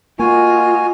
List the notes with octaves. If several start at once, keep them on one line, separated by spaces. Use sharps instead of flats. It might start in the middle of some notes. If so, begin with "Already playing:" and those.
A#3 F4 F#4 D#5 G#5